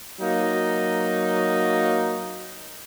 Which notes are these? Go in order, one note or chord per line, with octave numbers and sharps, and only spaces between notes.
F#3 A#3 D#4